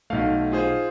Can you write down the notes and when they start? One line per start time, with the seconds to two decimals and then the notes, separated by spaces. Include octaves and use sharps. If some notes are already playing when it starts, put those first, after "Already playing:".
0.10 B1 A3 F5
0.52 F4 G#4 C5